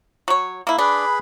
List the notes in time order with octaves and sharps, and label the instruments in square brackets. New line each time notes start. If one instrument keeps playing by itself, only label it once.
[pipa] F#3 C#5
A#3 E4
[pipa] D4 [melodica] G#4 B4 B5